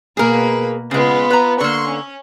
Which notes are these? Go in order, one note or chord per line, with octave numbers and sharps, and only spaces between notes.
B2 A#3 G#4 A#4 B4
C#3 G#3 B3 F4
B4 A#5
D3 A#3 C6 C#6
C#4